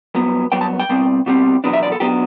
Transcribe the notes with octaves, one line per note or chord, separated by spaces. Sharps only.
G2 F#3 B3
G2 F#3 B3 G5
A5
G5
B2 G3 C4
B2 G3 C4
E2 B2 F#3 B3 D4
E5
D5
A4
B2 F#3 B3 D4 G4